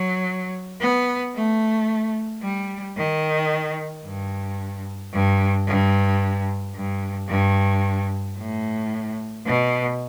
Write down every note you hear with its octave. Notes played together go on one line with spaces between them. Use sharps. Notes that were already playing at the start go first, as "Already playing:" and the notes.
Already playing: F#3
B3
A3
G3
D#3
G2
G2
G2
G2
G2
A2
B2